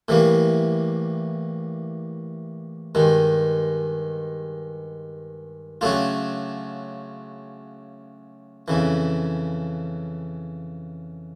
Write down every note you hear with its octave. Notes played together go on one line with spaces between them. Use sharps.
A2 E3 G3 A#3
G2 D#3 G#3
C#3 F#3 A3 D4 F4
F2 C#3 E3